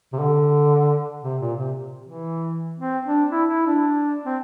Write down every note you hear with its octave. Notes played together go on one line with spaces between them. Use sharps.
C3
D3
C3
A#2
C3
E3
C4
D4
E4
E4
D4
C4